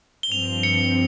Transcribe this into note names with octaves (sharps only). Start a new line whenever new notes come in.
G7
G2 F3 C4 F7
C#7